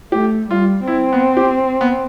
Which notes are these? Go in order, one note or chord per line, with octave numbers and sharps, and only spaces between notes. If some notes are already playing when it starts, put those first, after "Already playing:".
A3 G4
G3 F4
C4 E4
B3
G4
B3